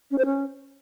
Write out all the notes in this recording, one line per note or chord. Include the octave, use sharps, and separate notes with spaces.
C#4
C5
C#4